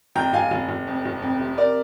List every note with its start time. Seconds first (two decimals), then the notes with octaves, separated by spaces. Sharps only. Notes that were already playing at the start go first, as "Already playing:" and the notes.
0.15 F1 G5 A#5
0.33 F1 F5 G#5
0.51 F1
0.69 F1
0.87 F2
1.05 F1
1.22 F2
1.40 C3
1.58 A#4 D5